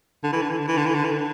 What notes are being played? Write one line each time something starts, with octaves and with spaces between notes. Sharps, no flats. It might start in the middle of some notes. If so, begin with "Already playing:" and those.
D3
E3
D3
E3
D3
E3
D3
E3
D3
E3
D3